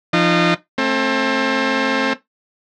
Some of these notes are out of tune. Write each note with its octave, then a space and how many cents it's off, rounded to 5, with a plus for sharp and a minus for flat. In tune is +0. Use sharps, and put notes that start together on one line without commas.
F3 -20 D#4 -30
A3 +0 C4 +30